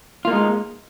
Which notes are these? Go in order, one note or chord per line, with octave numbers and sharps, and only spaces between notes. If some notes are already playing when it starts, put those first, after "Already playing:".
G#3 A#3 D#4 F4